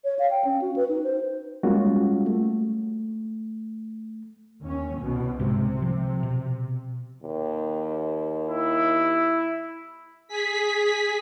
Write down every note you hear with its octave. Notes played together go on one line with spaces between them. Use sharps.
C#5
F5
G5
C#4
F#4
B4
D#4
C5
G3 G#3 A#3 C#4 F4 F#4
A3
D#2 C#4
C2 B2
D2 G#2 C3 G#3
F3
B2
D#2
E4
G#4 B6